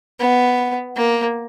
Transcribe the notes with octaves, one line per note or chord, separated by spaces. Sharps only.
B3
A#3